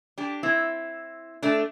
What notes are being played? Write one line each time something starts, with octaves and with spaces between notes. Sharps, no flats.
D4 G4
C4 E4
A3 D4